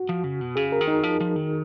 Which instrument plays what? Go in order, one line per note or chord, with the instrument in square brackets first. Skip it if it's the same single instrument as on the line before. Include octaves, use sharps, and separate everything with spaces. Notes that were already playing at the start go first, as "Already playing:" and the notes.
Already playing: [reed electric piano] F#4
[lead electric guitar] F3
C#3
B2
[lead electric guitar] C#3 [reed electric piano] G#4
[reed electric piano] A#4
[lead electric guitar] D#3
[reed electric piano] D#4
[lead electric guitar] F3
F3
D#3